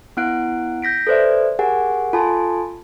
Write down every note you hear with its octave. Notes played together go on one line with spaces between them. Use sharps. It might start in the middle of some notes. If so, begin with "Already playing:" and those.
B3 E4 F#5 F#6 D7
G6 A#6 B6 D7
A4 B4 C5 D5 E5
G4 G#4 A#4 F#5 G#5
F4 A4 G#5 A5 C6